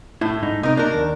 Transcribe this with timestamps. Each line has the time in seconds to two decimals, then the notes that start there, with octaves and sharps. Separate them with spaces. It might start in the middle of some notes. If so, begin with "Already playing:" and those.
0.21 A2 E4
0.42 G#2 D#4
0.63 C3 D#4 A#4
0.77 A#3 D4 D#4 A#4
0.94 D#2